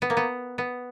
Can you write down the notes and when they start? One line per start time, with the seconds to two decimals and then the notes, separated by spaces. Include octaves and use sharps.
0.02 B3
0.10 A#3
0.17 B3
0.58 B3